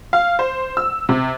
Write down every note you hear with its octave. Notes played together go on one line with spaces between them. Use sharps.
F5
C5
E6
C3